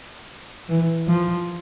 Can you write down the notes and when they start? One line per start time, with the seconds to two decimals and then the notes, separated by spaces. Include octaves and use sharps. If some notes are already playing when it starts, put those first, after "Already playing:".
0.69 E3
1.08 F3